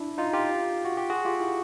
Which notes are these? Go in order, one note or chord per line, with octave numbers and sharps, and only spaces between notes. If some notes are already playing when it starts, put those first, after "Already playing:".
Already playing: D4 E4
D#4 F4
F4 G4
F#4
G4
F#4 G#4
F4 G4
E4 F#4